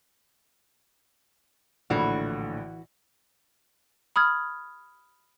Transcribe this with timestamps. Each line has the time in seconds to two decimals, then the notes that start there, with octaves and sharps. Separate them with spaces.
1.90 A#1 A2 D3 E3 F#4
4.16 B5 D#6 F6 G#6